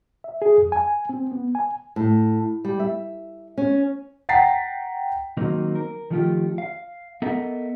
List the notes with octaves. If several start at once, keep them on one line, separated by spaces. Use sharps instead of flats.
E5
G#4
F2
G#5
C4
B3
G#5
A2
G3
E5
C#4
F#5 G5 A#5 A6 B6 C7
D#3 F#3 A#3 C4 D#4
A#4
D#3 F3 A3 D#4 F4 G4
F5
B3 A4 A#4 D#5 E5